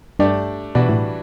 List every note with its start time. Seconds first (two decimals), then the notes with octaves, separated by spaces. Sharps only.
0.19 G2 A3 D4 G4 D5
0.75 B2 E3 G3 D4 F#4 B4
0.89 A2